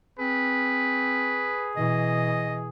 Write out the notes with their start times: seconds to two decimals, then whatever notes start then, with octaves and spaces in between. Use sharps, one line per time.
0.19 C4 G#4 B4
1.76 B2 E3 D#5